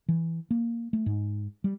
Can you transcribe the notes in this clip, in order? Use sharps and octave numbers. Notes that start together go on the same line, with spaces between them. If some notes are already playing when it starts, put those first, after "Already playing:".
E3
A#3
A3
G#2
G3